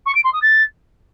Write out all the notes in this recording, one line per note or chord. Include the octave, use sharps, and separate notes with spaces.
C#6
D7
C6
D#6
A6